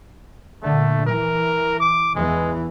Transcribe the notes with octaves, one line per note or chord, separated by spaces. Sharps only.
A#2 D3 A3
E3 A#4
D6
E2 E3 G#3